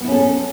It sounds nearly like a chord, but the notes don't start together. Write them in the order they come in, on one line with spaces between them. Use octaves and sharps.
B3 E4 C#4 A4